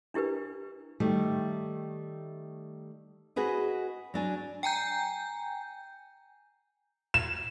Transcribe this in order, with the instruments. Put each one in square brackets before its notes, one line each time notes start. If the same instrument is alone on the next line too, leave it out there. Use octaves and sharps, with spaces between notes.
[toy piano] D4 E4 G4 A#4 B4
[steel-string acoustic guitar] D#3 G3 A3
[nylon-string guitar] F#4 G#4 B4 D#5
F#3 D4 G#5
[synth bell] G5 G#5 A#5 G6
[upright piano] E7